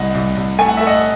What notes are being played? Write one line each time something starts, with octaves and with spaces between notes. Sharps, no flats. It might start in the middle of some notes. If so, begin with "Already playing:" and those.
Already playing: C2 D#5 F#5
C2
C2
A3 G#5
F#5
A3 E5
D#5 F#5